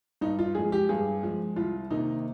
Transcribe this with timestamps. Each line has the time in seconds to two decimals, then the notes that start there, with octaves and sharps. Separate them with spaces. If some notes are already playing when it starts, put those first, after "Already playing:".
0.21 G2 D#4
0.39 F4
0.55 F3 G#3 G#4
0.72 G4
0.89 G2 G#4
1.23 F3 G#3
1.56 C2 F4
1.90 C3 D#3 A#3 D#4